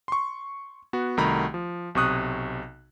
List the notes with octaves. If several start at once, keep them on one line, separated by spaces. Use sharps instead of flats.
C6 C#6
B3 F#4 F#5
C2 D#3 A3 F#4 A#5 B5
F3
B1 C3 C#6 D#6 F#6